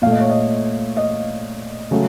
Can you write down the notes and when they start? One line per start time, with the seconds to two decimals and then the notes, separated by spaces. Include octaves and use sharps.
0.02 A#2 A3 F5
0.11 D#5
0.20 C#5
0.29 D#5
0.97 D#5
1.91 C#3 F#3 A3